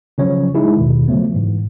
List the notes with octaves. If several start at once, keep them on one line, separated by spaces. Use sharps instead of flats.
C#3 F3 F#3 C#4 C#5
G#3 D#4 E4 G#4
D#2 B2 D#3
C#3 F3 F#3 A3 B3
G#2 E3